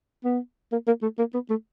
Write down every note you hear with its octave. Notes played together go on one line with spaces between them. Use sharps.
B3
A#3
A#3
A3
A#3
B3
A3